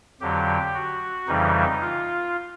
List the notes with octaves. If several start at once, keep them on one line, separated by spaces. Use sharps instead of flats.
F2 D3 F#3 G4
F#4
F2 C#3 E3 G3 D#4
F4